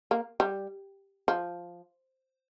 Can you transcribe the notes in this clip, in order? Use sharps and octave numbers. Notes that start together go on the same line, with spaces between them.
A#3
G3
F3